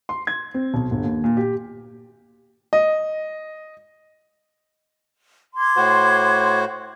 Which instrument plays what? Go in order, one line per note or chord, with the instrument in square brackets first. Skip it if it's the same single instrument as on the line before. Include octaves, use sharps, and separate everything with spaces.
[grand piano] C6
G#6
C4
B1
G1
D#2
A#2
G4
D#5
[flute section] C6 D6 G#6
[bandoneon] A2 F#4 C5